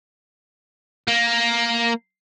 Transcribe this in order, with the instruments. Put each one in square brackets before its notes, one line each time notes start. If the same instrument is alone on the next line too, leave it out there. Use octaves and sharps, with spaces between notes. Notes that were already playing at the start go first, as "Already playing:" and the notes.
[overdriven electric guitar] A#3